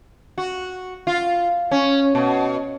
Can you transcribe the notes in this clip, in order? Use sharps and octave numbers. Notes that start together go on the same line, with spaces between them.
F#4
F4
C#4
B2